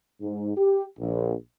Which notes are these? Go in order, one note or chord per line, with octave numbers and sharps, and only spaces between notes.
G#2
G4
A#1